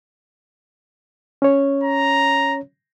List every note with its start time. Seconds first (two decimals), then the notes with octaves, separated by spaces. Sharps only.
1.42 C#4 C#5
1.84 A#5